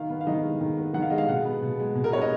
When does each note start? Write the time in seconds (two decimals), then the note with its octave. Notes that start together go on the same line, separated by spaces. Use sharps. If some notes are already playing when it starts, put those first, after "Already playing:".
Already playing: D#3 F5
0.10 B3
0.21 F5
0.27 D#3 D#5
0.43 G#3
0.61 D#3
0.78 B3
0.94 D#3 F#5
1.02 F5
1.10 G#3 D#5
1.18 F5
1.28 B2 F#5
1.45 B3
1.62 B2
1.79 G#3
1.95 B2
2.04 A#4
2.12 B3 C#5
2.21 D#5